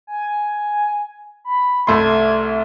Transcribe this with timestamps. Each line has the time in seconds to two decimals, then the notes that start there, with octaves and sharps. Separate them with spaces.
0.07 G#5
1.44 B5
1.87 C2 A3 C6 G#6